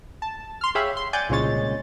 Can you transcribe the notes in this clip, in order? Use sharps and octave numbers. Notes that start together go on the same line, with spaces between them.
A5
C6 F6
G4 G#4 C#5 E5 F5 B5
C6
D5 F#5 G#5 G6 A6
C2 A#2 C#3 G#3 C#5 A6